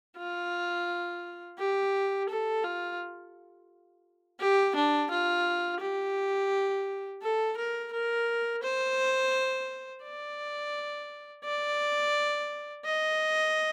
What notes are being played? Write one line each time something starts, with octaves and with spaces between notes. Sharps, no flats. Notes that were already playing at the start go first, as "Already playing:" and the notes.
F4
G4
A4
F4
G4
D4
F4
G4
A4
A#4
A#4
C5
D5
D5
D#5